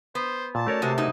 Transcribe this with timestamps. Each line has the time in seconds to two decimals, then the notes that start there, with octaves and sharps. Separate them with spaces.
0.15 B3 C5
0.55 A#2 A5
0.67 A3 C#4 F#4 A#4 C#5 D5
0.82 C3 G#3 F#4
0.98 B2 D#4 F#4